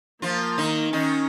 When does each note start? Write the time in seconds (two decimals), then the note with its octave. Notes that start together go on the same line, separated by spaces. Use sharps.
0.22 F3 A#3 F4
0.58 D#3 D#4
0.93 D#3 C#4 D#4